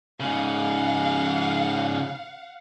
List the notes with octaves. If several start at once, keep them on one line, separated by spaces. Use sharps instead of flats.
G#2 C#3 F5 F#5